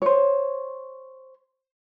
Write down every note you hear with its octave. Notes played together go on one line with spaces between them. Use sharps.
C5 C#5